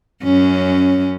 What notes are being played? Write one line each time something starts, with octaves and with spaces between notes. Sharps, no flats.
F#2 C#4